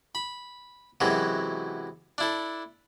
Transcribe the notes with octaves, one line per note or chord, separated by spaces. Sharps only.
B5
F#2 C3 E3 F#3 G#3
D4 E4 A4